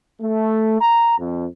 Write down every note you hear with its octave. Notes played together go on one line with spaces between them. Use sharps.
A3
A#5
F2